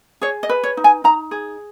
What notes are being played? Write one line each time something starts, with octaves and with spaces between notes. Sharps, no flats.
G#4 C#5
D#5
B4
C#5
D#4
G#5
D#4 A#5
G#4